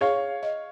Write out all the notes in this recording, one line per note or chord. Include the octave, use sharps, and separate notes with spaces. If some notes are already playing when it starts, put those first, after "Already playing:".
G#4 C#5 F5
D#5